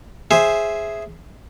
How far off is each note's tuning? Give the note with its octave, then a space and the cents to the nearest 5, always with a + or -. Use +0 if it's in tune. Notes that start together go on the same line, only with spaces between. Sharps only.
G#4 +0 C5 +0 E5 +0